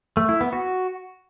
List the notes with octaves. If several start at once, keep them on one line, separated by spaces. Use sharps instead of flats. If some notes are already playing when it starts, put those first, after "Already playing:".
A3
E4
B3
F#4